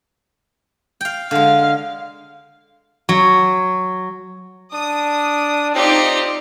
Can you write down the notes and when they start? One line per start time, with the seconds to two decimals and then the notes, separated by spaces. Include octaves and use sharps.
1.01 F5 G5
1.31 D3 G#3 F5
3.09 F#3
4.73 D4 D#6
5.75 C4 D#4 F4 G4 D5